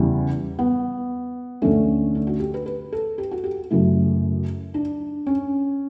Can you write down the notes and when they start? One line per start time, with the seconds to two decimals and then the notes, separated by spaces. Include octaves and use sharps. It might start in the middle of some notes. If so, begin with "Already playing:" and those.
Already playing: E2 C#3 E3 G3
0.59 B3
1.62 D2 D3 A3 C#4
2.15 D4
2.27 F#4
2.40 G4
2.54 B4
2.66 B4
2.92 A4
3.18 G4
3.31 F#4
3.44 G4
3.71 F#2 C#3 F#3 A3 E4
4.74 D4
5.27 C#4